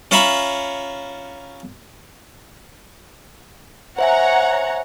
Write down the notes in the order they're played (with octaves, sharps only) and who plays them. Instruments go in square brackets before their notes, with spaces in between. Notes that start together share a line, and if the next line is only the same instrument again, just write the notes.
[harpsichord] C#4 F4 C#5 E5 A#5 B5
[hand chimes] C5 E5 G#5 [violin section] C#5 F#5 A#5